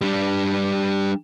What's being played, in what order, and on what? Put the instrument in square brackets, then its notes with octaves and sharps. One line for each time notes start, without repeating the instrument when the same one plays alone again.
[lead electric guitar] G3 D4